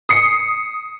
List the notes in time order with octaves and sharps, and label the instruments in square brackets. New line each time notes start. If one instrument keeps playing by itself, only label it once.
[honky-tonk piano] D#6 C7 C#7